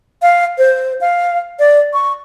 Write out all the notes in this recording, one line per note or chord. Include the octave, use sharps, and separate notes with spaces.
F5
C5
F5
D5
C#6